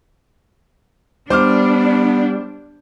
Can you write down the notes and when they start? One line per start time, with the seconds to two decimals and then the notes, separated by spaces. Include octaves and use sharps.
1.30 G3 B3 D4 C5 D6 F6